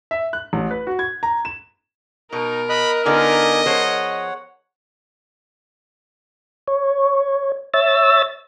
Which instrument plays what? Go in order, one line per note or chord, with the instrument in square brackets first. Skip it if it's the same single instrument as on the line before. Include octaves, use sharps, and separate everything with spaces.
[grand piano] E5
F#6
A1
B4
F#4
G#6
A#5
E7
[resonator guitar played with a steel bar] B2 [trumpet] D#4 [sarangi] A#4
[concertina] D#5 D#6 F#6 [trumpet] B5
[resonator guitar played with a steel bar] D3 B3 F4 [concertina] D#4 D5 G#5 [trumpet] D#5
[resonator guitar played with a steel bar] F3 G#4 C5 [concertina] C#5 F#5
[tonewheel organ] C#5
C#5 E5 E6 A6